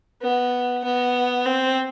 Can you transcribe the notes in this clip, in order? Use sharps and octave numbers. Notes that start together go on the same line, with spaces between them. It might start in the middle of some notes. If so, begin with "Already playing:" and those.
B3
B3
C4